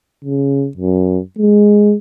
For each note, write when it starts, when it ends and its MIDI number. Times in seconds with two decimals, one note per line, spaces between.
0.24 0.68 49
0.77 1.19 42
1.38 1.94 56